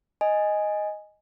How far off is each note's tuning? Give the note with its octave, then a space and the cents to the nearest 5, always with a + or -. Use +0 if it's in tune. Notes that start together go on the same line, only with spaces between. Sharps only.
D#5 +0 G#5 +0